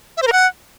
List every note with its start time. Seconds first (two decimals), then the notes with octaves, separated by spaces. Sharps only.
0.17 E5
0.22 C5
0.27 A#4
0.33 F#5